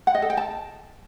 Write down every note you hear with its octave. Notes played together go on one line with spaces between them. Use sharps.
F#5
D#5
A4
G5
A5